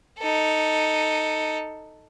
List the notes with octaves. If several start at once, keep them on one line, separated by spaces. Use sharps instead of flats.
D#4 A4